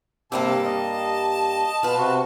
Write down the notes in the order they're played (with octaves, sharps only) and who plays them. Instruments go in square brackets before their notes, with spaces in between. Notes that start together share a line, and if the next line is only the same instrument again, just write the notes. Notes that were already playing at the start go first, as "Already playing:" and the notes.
[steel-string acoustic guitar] G2 G3 A#3 [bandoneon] C3 D6 E6 [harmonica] A5
[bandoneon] D#5
[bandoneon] B2 [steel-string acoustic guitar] F4 B4
[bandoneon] C3 F#4